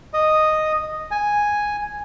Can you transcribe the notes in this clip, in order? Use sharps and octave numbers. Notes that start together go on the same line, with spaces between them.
D#5
G#5